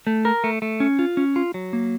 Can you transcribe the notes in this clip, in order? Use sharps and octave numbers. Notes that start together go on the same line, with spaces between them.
A3
A#4
A3
A3
C#4
F4
C#4
F4
F#3
A#3